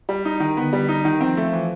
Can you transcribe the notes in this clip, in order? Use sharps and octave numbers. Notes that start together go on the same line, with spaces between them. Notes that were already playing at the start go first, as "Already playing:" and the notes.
G3
D#4
D#3
D3 B3
G3
D#4
D#3
F3 C4
A3
E3